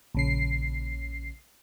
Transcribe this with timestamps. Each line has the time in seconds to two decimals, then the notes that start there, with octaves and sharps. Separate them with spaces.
0.15 A#1 C#3 C7